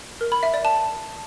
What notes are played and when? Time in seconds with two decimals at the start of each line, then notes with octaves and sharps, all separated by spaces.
0.21 A#4
0.32 B5
0.43 E5
0.54 D5
0.65 A5